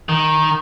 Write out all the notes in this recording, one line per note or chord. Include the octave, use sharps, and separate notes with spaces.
D#3